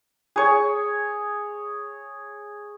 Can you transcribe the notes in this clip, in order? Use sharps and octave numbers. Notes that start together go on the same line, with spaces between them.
G#4 C#5